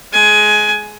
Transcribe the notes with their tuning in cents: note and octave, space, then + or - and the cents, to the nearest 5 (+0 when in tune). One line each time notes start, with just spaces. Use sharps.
G#3 +25 G#5 +15